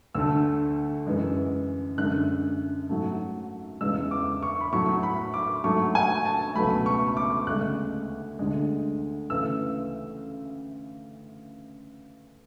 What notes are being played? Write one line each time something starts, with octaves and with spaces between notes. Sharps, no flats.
D2 D3 A3 E6
F#2 E3 G#3
F#2 D3 G#3 F#6
G#2 F#3 A3
E2 C#3 G#3 E6
D6
C#6
B5
A2 F#3 A3 C#6
B5
D6
G#2 F#3 A3 C#6
G#5
A5
C#2 B2 F#3 A3 B5
C#6
D6
D2 C#3 G#3 F#6
D2 D3 G#3
D2 C#3 E3 E6